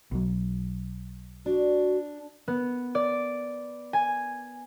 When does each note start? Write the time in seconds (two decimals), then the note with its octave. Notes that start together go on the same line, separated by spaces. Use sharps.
0.12 B1 F#3
1.46 D4 F#4
2.48 B3
2.95 D5
3.93 G#5